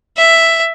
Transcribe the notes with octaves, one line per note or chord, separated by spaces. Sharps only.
E5